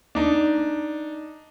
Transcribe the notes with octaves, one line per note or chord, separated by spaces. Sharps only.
D4 D#4